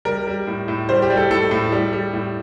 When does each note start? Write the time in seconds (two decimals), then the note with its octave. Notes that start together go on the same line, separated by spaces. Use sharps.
0.05 G3 A#4
0.27 G3
0.47 A2
0.68 A2
0.89 G3 C5
1.02 G4
1.10 G3
1.17 A4
1.30 A2 A4
1.51 A2
1.72 G3
1.93 G3
2.13 A2